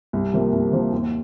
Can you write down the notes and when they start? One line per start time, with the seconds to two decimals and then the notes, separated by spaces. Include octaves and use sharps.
0.13 C2
0.33 C3 F3 A#3
0.52 C2
0.72 C3 F3 A#3
0.92 D#2